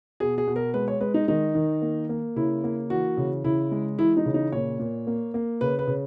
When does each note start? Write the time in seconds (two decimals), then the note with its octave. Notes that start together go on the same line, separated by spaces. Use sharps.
0.20 B2 G#4
0.38 G#4
0.47 B2
0.56 A#4
0.74 G#3 B4
0.88 C#5
1.01 G#3 B4
1.14 D#4
1.28 D#3 D#4
1.55 D#3
1.82 A#3
2.09 A#3
2.36 C#3 E4
2.64 A#3
2.90 E3 F#4
3.17 C#3
3.44 C#3 E4
3.71 G#3
3.99 E3 E4
4.17 D#4
4.26 C#3
4.34 D#4
4.52 A#2 C#5
4.80 A#2
5.07 A#3
5.34 A#3
5.61 C#3 B4
5.79 B4
5.87 C#3